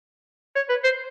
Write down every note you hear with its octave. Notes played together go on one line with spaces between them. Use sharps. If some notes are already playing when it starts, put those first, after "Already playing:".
C#5
B4
C5